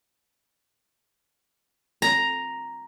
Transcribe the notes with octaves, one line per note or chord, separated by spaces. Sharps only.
A#5